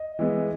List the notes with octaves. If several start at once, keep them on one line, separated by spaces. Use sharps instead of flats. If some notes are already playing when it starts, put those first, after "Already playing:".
Already playing: D#5
E3 G#3 B3